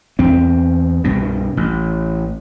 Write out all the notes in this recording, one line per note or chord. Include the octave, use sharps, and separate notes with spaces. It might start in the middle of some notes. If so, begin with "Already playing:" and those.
E2 C4
C2 G2 B2
A1